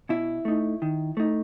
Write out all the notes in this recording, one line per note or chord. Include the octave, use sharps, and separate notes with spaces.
B2 E4
A3 D#4
D#3
A3 D#4